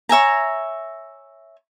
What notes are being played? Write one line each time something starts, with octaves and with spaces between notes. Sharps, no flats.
C#5 E5 G#5 A#5